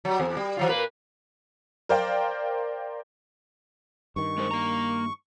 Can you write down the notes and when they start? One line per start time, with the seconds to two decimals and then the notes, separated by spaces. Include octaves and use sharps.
0.05 F#3 G3
0.20 E2
0.37 G3
0.57 E3 F#3 F4
0.69 A#2 A#3 B4
1.89 A#4 C5 D5 F5 G5
4.16 G2 D#3 C#6
4.37 G#3 A#4 C5
4.51 A#3 A#5